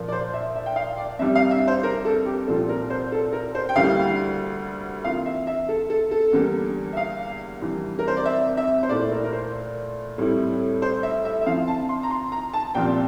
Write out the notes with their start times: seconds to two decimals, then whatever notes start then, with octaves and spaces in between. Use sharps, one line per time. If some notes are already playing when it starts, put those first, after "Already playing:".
Already playing: A#2 F3 A#3
0.08 D5
0.12 C5
0.34 E5
0.55 E5
0.66 G5
0.76 F5
0.97 D5
1.19 F2 C3 G3 D4 E5
1.35 F5
1.51 E5
1.68 C5
1.83 A#4
2.05 A4
2.26 G4
2.47 C2 A#2 F3 C4 F4 A4
2.69 A#4
2.90 C5
3.12 A4
3.33 A#4
3.55 C5
3.69 G5
3.76 D2 D3 G3 A#3 E4 F5
5.04 C3 E3 A#3 F4 F5
5.26 E5
5.47 E5
5.69 A4
5.90 A4
6.11 A4
6.33 E2 D3 G3 A#3
6.93 E5
6.97 F5
7.61 F2 C3 E3 G3
7.99 A#4
8.08 C5
8.17 D5
8.26 E5
8.57 E5
8.83 C5
8.89 A#2 A3 E4 D5
9.11 A#4
9.24 A#4
9.33 C5
10.18 A2 G3 C4 E4
10.82 C5
11.03 E5
11.25 E5
11.41 E5
11.46 D3 F3 C4 E4 F5
11.68 A5
11.89 C6
12.03 A#5
12.10 C6
12.32 A#5
12.53 A5
12.75 C2 A#2 F3 C4 G5